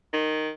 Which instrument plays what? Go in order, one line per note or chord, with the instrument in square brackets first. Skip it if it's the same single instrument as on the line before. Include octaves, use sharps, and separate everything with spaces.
[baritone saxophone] D#3